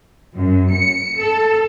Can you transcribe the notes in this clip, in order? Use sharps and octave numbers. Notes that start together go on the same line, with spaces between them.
F#2
C#7
A4